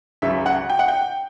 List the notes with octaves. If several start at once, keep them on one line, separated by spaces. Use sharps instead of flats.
C#2 C#3 F#3 E5
F#5
G5
F#5
G5